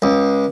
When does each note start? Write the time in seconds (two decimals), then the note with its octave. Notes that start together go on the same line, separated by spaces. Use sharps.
0.02 C#2